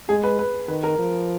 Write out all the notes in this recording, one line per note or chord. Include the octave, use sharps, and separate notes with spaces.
G#3 G#4
B4
B4
D#3 B4
A#4
F3